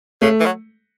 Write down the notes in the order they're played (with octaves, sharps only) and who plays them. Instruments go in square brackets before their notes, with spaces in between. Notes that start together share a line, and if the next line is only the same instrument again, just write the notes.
[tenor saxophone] C#3 [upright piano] A3
[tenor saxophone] E3
F#3